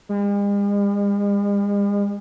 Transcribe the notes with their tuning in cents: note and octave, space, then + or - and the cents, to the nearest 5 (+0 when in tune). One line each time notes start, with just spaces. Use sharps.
G#3 -45